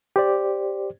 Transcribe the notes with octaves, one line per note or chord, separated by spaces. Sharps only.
G4 C5 D5